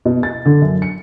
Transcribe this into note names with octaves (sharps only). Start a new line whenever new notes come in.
B2
A6
D3
F#2
C#7